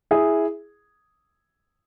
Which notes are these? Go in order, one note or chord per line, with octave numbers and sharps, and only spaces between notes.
E4 G#4